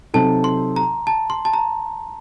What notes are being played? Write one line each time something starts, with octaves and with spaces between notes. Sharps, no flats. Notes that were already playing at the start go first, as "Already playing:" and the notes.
C3 F#3 C4 D#4 A4 A5
C6
A#5
A5
C6
A5
A#5